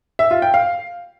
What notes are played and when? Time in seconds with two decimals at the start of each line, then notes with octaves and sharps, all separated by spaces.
0.19 E5
0.31 F4
0.42 G5
0.54 F5